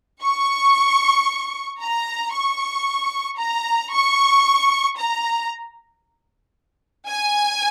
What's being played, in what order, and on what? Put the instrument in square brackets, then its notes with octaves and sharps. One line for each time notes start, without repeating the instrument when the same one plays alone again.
[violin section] C#6
A#5
C#6
A#5
C#6
A#5
G#5